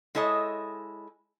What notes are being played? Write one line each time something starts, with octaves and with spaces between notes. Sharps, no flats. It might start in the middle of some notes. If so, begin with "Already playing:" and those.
G#3 E4 A4 C#5 D#5